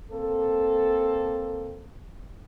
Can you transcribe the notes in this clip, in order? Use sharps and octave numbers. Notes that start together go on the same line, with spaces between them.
A#3 C4 A4